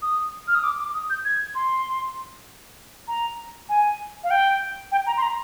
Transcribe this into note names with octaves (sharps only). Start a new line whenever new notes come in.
D#6
F6
D#6
D6
D6
D#6
G6
G#6
C6
A#5
G#5
F5
G5
G5
A#5
C6
A#5